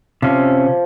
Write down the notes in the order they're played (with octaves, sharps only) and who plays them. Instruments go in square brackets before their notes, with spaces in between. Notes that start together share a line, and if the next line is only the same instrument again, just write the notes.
[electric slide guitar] C3 C#4 [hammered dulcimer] F3